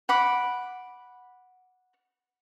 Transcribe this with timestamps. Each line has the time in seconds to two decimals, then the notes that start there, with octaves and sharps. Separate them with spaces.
0.09 F#5 B5 D6